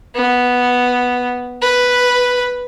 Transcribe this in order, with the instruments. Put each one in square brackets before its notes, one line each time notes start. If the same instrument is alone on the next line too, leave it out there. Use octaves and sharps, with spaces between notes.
[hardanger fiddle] B3
B4